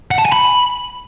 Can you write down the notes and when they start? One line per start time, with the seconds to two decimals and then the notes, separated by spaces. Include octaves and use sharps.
0.11 F#5
0.18 A5
0.25 G#5
0.32 B5